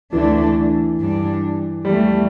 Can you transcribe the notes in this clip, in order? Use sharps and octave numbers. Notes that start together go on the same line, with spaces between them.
D2 D3 E3 A3 D4
G2 G3 D4
E2 E3 G3 A3